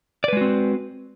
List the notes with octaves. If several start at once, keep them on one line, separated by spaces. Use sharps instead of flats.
G#3 C4 F#4 B4 D5